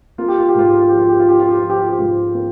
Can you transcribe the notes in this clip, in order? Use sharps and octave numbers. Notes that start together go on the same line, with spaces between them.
A#3 F4
G4
F4
G4
G#2 F4
G4
F4
F3 G4
F4
G4
F4
F3 G4
F4
G4
F3 F4
G4
F4
G4
G#2 F4
A#3